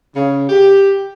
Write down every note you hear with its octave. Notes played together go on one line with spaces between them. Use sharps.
C#3
G4